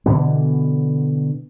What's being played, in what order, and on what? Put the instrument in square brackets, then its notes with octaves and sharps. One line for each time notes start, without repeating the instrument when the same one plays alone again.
[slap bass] B2 D3 E3 B3